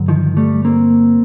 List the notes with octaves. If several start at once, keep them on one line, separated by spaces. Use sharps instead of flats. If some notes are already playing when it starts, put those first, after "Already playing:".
Already playing: G2 D3 F#3
D#3 F3
G3 A3
A#3 C4